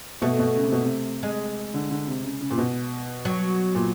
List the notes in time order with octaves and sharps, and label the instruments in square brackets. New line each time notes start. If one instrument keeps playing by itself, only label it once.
[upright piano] B2 [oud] A3
[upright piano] B2
C#3
C3
B2
C3
[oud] G#3
[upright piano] D3
D3
C3
C#3
C#3
A#2
B2
[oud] F#3
[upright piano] A#2